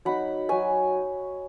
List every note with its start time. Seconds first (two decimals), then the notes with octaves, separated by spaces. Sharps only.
0.05 F#3 D#4 F#5 B5
0.49 F#3 D#4 G#5 C#6